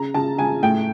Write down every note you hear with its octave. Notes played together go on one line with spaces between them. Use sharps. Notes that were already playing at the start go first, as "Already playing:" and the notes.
Already playing: C#3 A#5
C#3 A5
C#3 G#5
A2 G5